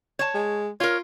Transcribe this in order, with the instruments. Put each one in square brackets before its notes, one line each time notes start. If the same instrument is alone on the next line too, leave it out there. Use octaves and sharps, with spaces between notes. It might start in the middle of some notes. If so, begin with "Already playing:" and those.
[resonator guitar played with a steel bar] C#5 A5
[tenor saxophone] G#3
[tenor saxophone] F4 [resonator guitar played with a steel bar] A#4 C#5